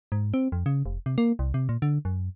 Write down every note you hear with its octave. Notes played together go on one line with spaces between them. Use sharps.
G#2
C4
F2
C#3
F1
C3
A#3
C2
C3
A#2
D3
F#2